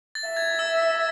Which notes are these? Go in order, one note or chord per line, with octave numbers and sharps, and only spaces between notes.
A6
E5
G#6
E6
E6